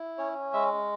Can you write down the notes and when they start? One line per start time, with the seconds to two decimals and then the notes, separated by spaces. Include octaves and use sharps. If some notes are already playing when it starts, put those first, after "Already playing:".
Already playing: E4
0.18 C#4 C#5
0.53 G#3 E5